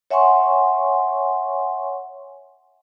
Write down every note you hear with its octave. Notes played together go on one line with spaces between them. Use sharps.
C#5 E5 F#5 G#5 C6 C#6